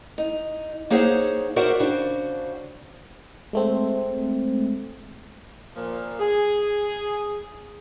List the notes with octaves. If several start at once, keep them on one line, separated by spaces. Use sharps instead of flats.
D#4
A#3 D#4 G#4 C5 C#5 F#5
F#4 A#4 C5 D5 E5 F#5
C#3 D4 F#4 C5
G#3 A3 C4
A#2 F3
G#4